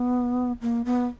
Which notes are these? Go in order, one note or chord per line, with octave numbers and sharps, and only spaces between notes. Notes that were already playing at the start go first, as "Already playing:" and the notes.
Already playing: B3
A#3
B3